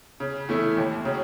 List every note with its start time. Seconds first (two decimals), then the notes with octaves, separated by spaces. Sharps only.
0.20 C#3
0.49 E3 A3 E4
0.77 D#2
1.05 C#3 F#3